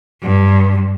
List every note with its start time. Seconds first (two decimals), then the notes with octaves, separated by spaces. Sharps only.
0.23 G2